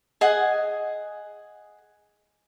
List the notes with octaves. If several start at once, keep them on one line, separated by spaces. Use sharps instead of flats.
G#4 D#5 F#5 G#5